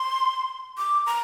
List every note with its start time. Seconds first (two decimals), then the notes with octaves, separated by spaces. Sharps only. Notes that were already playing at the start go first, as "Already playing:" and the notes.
Already playing: C6
0.78 D6
1.06 A#5